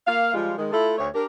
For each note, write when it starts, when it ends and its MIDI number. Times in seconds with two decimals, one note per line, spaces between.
0.07 0.33 58
0.07 0.33 77
0.34 0.53 53
0.34 0.53 55
0.34 0.53 56
0.34 0.53 65
0.58 0.71 51
0.58 0.71 56
0.72 0.94 57
0.72 0.94 64
0.72 0.94 65
0.72 0.94 69
0.98 1.09 38
0.98 1.09 57
0.98 1.09 73
1.15 1.25 62
1.15 1.25 67
1.15 1.25 70